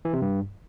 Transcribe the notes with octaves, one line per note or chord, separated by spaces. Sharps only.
E3
C3
G2